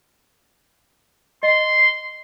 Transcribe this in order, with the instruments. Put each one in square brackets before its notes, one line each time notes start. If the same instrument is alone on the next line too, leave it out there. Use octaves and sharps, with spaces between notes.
[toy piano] D#5 [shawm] C6